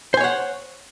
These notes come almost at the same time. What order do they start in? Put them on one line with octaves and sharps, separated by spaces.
C5 G#5 C#5 F#5